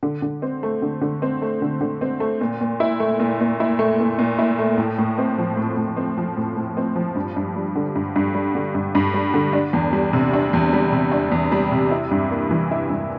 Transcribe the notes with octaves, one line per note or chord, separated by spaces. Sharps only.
D3
D3
C4
A3
D3
D3
C4
A3
D3
D3
C4
A3
A#2
A#2
E4
A3
A#2
A#2
E4
A3
A#2
A#2
E4
A3
A2
A2
C4
F3
A2
A2
C4
F3
A2
A2
C4
F3
G2
G2
G3
D3
G2
G2
G3
D3
G2
G2
G3
D3
D4
E2
G3
C3
D4
E2
G3
C3
D4
E2
G3
C3
E4
G2
A#3
E3
E4
G2